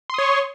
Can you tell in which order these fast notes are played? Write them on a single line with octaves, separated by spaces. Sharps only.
C6 D#6 C#5 C#6